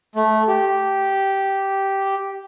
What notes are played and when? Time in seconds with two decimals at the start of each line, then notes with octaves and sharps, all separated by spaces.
0.15 A3
0.48 G4